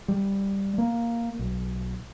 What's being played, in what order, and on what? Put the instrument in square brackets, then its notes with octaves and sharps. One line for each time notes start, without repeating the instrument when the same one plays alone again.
[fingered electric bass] G3
A#3
B1